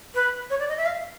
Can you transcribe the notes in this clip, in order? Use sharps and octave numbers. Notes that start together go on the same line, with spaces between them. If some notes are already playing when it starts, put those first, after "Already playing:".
B4
C#5
D5
D#5
E5
F5